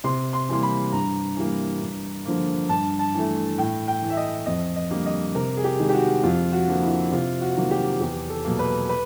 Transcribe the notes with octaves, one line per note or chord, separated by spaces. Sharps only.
C3 C6
C6
E3 G3 A#3 C6
B5
G2 A#5
E3 G3 A#3
G2
D3 F3 A#3
G2 A5
A5
E3 A3
A2 G5
G5
E3 A3
E5
D#5
F2 D#5
D#5
D3 G3 A#3
D#5
C3 A#4
G#4
G4
D#3 G#3
G4
F#4
F2 F4
F#4
D3 F3 A#3
E4
C3 F4
F#4
D#3 F#3 A#3
G4
E2 G4
A4
B2 F#3 A#3
B4
B4